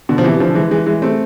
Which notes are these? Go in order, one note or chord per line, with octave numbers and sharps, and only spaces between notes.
B2 D3
F3
C3 E3
D3 F3
E3 G#3
E3 G#3
E3 G#3
A3 C4